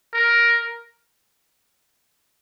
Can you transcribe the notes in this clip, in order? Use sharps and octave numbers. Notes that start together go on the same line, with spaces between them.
A#4